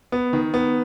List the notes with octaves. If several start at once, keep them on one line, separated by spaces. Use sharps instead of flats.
B3
D#3
B3